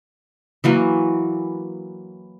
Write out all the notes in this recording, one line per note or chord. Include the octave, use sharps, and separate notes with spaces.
E3 F#3 A#3